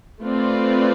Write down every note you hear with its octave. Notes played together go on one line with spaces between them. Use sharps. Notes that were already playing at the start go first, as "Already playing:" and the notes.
A3 C4 F4 B4 D5